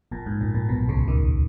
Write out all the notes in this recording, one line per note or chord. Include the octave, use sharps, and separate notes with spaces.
A#1 A#2
G#2
A#1 A#2
A#1 A#2
B1 B2
C#2 C#3
D#2 D#3